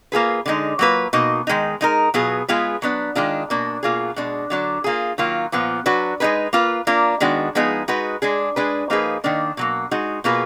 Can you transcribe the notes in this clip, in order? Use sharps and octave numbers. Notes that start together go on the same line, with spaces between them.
A#3 F4 G#4 B4
D3 G#3 D#4
F#3 A#3 F4 B4
B2 A#3 D#4
D#3 G#3 D#4
G#3 D#4 A#4
B2 F#3 B3 F4 G#4
G#3 B3 F4 G#4 B4
F#3 B3 D4
D#3 G#3 D4 F4
B2 A#3 D4
B2 A#3 F4 G#4
B2 G#3 D4
D3 F#3 D4
A#3 F4 G#4
D#3 F#3 A#3 F4
A#2 F3 B3
F#3 D4 F#4 B4
G#3 D#4 G#4 B4
A#3 F4 B4
A#3 D4 F4 A#4
D#3 G#3 B3 D4 F#4
F3 G#3 B3 D#4 G#4
G#3 D#4 F#4 B4
G#3 D4 G#4
G#3 D4 G#4 B4
F3 A#3 D#4 G#4 B4
D#3 A#3 D4
B2 F#3 A#3
G#3 D#4 F#4
B2 A#3 F4 G#4 B4